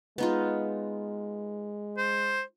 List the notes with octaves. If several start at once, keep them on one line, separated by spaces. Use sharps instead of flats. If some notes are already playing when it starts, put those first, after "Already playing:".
G#3 B3 D#4 F4
C5